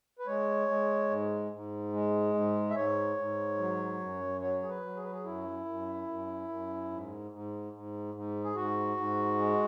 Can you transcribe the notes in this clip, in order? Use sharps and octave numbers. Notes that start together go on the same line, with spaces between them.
B4
G#3 C#5
G#3
G#2
G#2
G#3
G#2
E5
G#2 C#5
G#2
F#3
F#2
F#3 C#5
G#4
B4
F#3
G#4
B4
G#4
F#2 E4
F#2
F#2
F#2
G#2
G#2
G#2
G#2
G#4
G#2 F#4
G#2
G#3